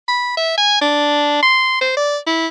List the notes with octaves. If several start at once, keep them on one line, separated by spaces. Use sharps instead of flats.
B5
E5
G#5
D4
C6
C5
D5
E4